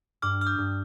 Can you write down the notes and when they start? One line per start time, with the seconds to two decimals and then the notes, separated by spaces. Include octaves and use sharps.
0.22 G2 D6 F6
0.41 F6
0.47 D#6 G6
0.58 G2